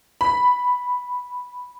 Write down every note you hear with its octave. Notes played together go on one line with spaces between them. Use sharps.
B5